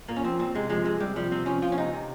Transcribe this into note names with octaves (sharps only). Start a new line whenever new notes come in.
A#2 A#3
C#4
F3 C4
A#2 C4
C3 G#3
F3 G#3
C3 G#3
C3 G3
F3 G3
C3 C4
F3 C#4
F3 F4
C#4
C3 D#4
C3